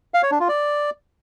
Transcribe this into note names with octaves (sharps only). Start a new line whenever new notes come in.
F5
C#5
D4
F4
D5